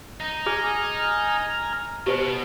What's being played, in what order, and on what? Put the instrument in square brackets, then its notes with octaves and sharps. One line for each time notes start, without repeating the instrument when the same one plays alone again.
[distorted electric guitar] D#4
[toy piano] G#4 [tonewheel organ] G#5 A#5 F6
[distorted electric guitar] B2 [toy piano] G4 B4 C5